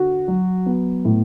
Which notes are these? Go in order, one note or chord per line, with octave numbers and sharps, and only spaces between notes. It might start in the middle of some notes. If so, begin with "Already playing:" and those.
Already playing: D3 F#4
F#3
B3
A2